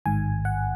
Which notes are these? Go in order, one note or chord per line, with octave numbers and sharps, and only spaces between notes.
A1 G#2 D#3 G#5
F#5